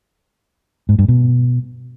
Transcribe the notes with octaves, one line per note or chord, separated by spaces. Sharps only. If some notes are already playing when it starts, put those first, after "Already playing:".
G#2
G2
B2